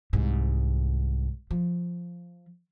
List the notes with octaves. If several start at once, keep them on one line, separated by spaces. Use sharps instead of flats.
C2 G#2
F3